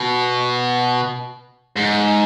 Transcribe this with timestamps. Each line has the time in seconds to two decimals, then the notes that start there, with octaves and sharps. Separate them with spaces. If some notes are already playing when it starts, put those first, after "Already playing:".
Already playing: B2
1.76 G#2